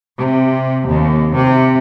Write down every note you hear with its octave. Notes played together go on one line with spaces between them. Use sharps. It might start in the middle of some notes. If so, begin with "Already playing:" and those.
C3
D#2
C3